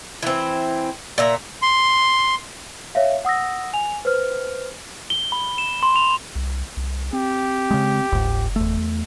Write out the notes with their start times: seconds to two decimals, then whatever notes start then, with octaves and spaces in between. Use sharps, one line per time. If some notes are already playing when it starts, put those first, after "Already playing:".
0.22 E3 C4
1.18 A#2 E5 A#5
1.62 C6
2.95 C#5 E5 F5
3.25 F#5 D#6 E6 A#6
3.73 G#5 F7
4.05 B4 C5 F6
5.10 G7
5.32 B5
5.58 E7
5.83 C6
5.96 F7
6.36 C2
6.77 C2
7.13 C4 G4
7.71 C#3 G#3
8.12 F#1 C#2 G#2
8.56 E2 A3